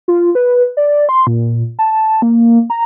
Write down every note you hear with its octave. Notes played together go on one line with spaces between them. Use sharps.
F4
B4
D5
C6
A#2
A5
A#3
A#5